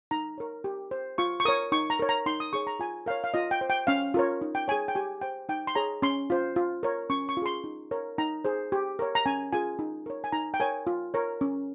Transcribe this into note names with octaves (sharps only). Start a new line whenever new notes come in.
D#4 A#5
A#4 C#5
G4
C5
F4 C#6
C#6
A#4 C#5 D#6
D#4 C#6
A#5
A#4 C#5
A#5
D#4 C6
D#6
G#4 C#5 C#6
A#5
F4 G#5
A#4 C#5 F5
F5
F4 D#5
G5
C5
G5
C#4 F5
F4 A#4 C#5
D#4
G5
G#4 C#5 G#5
G5
G4 G#5
C5 G5
D#4 G5
C6
G#4 C#5 A#5
C#4 C6
F4 C5
F4
A#4 C#5
C#4 C#6
C#6
F4
G#4 C6
D#4
A#4 C#5
D#4 A#5
G#4 C5
G4
A#4 C#5
A#5
C#4 G#5
F4 G#4 G#5
D#4
A#4 C#5
G#5
D#4 A#5
G5
A#4 C#5 G#5
F4
A#4 C#5
C#4